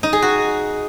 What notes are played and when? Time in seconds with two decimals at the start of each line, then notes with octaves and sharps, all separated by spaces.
0.03 D#4
0.13 G#4
0.22 F#4